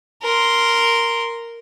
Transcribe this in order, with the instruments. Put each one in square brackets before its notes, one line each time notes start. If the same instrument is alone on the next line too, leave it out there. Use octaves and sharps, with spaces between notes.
[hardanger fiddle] A#4 C6